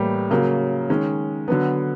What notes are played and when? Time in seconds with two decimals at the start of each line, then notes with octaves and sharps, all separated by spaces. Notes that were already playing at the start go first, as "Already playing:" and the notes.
Already playing: A2 E3 G3 A#3
0.30 C#3 F#3 A#3
0.90 D#3 G#3 C#4
1.48 D3 F#3 B3